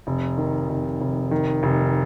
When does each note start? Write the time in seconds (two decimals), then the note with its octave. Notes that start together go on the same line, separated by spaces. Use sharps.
0.07 F1
0.38 D#3
0.69 F1
1.01 F1
1.31 D#3
1.63 F1